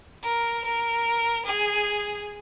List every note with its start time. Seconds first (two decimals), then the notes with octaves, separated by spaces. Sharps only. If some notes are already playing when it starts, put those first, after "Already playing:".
0.23 A#4
0.64 A#4
1.46 G#4